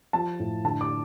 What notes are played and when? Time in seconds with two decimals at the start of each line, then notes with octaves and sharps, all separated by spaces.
0.13 F3 A5
0.40 A2
0.64 D3 A5
0.81 D6